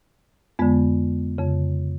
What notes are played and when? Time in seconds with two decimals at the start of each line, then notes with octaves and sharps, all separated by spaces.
0.59 F2 D3 G#3 B3
1.38 F2 C#3